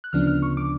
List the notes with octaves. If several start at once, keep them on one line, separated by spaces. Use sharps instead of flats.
F#6
D2 C#3 F3 B3 D4 F6
F6
C#6
D6